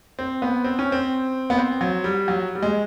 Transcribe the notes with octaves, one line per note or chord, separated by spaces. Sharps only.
C4
B3
C4
C#4
C4
B3
C4
F#3
G3
F#3
G3
G#3